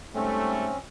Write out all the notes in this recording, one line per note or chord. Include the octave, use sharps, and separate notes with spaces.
G#2 G3 A3 C4 C#4